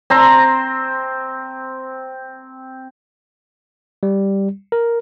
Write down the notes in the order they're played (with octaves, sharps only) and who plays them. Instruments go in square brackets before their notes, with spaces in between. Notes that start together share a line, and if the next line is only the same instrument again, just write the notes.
[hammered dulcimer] C4 A#5 C6
[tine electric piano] G3
A#4